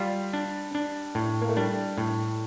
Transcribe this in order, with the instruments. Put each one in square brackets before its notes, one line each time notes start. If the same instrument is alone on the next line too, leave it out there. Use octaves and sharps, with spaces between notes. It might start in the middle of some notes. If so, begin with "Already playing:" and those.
Already playing: [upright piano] G3 [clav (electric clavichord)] F4
[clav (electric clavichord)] D4
D4
A2
[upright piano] A#3
A3
[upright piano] G3 [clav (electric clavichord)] D4
[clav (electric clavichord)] A2